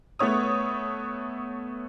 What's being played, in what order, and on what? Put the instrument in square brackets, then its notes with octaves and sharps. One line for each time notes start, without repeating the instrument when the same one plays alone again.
[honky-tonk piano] A3 B3 C#5 D#6